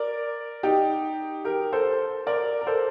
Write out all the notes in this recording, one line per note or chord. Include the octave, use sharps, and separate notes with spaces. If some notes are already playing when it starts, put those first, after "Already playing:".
Already playing: A#4 D5
D#4 G4
G4 A#4
A4 C5
A#4 D5
A#4
A4 C5